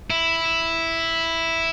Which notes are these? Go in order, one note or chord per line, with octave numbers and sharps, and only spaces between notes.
E4